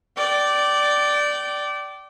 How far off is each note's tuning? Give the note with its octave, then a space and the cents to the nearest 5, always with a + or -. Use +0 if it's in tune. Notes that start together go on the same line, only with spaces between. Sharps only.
D5 +0 G5 -30